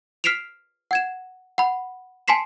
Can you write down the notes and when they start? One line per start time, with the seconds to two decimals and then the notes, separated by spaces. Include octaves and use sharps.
0.24 F6 B6 C7 D7 E7 F7
0.91 F#5 G#6 E7
1.58 F#5 B5
2.28 G#5 A5 C6 B6 C7 E7